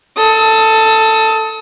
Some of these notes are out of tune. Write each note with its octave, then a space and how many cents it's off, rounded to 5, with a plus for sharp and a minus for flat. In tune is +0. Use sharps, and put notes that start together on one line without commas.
A4 +10 D#6 +40